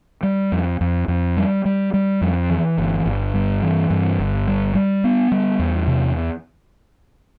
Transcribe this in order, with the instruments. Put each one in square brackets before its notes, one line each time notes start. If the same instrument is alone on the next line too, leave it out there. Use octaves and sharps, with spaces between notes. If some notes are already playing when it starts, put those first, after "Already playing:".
[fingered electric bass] G3
F2
F2
F2
G3
G3
G3
F2
E3
G1
G1
G2
E3
G2
G1
G3
G3
B3
G3
E2
C3